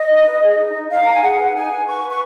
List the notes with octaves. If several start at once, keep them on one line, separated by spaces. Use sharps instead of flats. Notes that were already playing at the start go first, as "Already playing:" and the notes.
Already playing: D#5
D#4
B4
G#4
D#4
D#4
D#4 F5
D#4 A#5
G#5
G#4 F#5
B4
D#4 G#5
B4
B4 C#6
B4
C#6